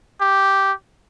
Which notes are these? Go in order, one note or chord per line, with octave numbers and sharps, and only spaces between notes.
G4